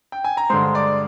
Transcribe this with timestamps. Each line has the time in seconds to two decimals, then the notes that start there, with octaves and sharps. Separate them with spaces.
0.12 G5
0.24 G#5
0.37 A#5
0.49 G2 D3 G#3 C5 C6
0.75 D5 D6